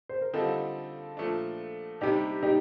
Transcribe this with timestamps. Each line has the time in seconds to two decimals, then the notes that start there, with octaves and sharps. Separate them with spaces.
0.09 C5
0.22 A#4
0.33 D3 G3 C4 D#4 F4 A4
1.17 A#2 F3 A3 D4
2.01 C3 G3 D4 D#4 G4
2.43 D#4 G4